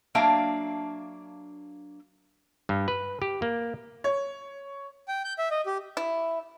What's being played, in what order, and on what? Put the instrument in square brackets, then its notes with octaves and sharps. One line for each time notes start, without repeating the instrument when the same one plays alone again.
[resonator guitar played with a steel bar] F#3 A#3 D4 E5 F5
[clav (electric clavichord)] G2
B4
G4
A#3
[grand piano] C#5
[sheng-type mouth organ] G5
G6
E5
D#5
G4
[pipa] E4